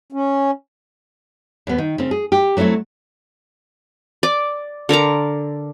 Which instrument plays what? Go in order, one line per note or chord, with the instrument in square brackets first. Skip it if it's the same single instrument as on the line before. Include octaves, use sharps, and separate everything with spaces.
[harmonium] C#4
[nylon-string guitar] D#2 B3
D#3
C#3 C4
G#4
G4
F#3 A3 C4 E4 C#5
[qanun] D5
D3 A#4 D5 A#5